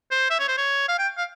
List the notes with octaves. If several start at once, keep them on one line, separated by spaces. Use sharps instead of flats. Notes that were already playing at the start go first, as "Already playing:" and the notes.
C5
E5
C#5
C5
C#5
F5
G5
F5